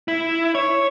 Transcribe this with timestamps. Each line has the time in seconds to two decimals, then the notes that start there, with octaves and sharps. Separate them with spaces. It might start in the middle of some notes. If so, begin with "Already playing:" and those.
0.08 E4
0.55 C#5